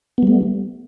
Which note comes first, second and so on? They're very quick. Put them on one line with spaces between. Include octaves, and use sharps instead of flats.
B3 G3 A3